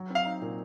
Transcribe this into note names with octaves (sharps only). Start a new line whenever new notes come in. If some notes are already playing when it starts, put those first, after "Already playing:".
Already playing: F#3
C4
F5
D#4
A#2